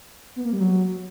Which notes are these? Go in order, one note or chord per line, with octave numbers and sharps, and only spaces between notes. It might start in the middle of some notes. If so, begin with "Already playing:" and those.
B3
A#3
G3
F#3